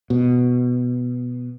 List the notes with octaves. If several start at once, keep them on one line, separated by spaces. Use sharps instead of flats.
B2